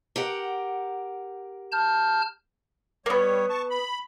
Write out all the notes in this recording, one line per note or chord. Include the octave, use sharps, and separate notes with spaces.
G4 A#4 F#5
A5 F6 G6
G3 A#3 B3 C#5
A5 C#6
B5